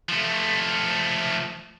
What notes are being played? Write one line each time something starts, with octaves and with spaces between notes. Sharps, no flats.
F3 A3